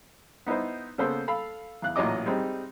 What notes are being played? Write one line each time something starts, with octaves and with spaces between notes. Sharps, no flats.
B3 D#4 E4 B4 C5
C#3 A#3 B3 A4 C5
A4 F5 B5
E2 F5 F#6
A1 A#2 F#3 C#5 D#5 D6
G3 G#3 C4 D#4